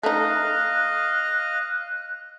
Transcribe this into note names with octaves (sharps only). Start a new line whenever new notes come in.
A3 D#4 D#5 F5 F#6